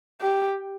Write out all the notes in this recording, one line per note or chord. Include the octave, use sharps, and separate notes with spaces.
G4